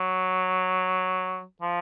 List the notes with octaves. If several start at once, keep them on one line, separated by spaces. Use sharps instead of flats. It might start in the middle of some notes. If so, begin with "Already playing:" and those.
Already playing: F#3
F3